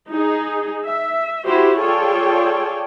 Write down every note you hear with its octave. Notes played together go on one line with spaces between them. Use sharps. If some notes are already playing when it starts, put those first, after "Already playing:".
D#4 G#4
E5
E4 F#4 G4 C5
F4 G#4 A4 C#5 D5 G5